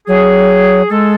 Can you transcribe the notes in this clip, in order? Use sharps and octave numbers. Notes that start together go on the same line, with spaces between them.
F#3 G#4
G#3 A4